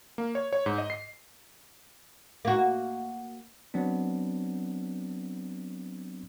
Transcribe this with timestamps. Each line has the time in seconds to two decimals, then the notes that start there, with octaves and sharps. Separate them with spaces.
0.18 A#3
0.35 C#5
0.53 C#5
0.66 G#2
0.78 D#5
0.90 C7
2.45 A#3 F#4
3.74 F#3 B3 C4 D4